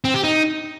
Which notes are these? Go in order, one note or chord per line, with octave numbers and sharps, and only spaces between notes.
C4
G4
D#4